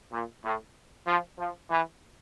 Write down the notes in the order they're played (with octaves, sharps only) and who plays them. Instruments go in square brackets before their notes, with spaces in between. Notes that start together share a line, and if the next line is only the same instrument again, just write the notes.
[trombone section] A#2
A2
F3
F3
E3